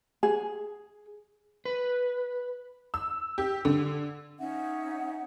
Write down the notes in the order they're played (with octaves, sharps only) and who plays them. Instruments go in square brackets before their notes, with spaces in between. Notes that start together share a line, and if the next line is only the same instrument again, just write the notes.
[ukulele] G#4
[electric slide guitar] B4
[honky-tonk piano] E6
G4
D3
[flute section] C#4 D#4 E5 F#5